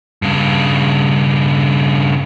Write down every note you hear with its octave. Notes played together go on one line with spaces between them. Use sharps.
G2 C#3